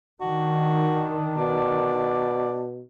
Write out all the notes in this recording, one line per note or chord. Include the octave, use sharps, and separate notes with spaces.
D#3 D4 F#4
B2 D5